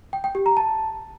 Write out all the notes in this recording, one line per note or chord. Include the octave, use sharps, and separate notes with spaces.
G5
G5
G4
A#5
A5